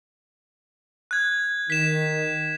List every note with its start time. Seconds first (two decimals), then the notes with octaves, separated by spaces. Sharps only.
1.11 F#6 G#6
1.70 D#3 B6 E7